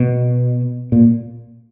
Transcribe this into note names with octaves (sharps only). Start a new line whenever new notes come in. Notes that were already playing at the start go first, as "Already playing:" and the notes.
Already playing: B2
A#2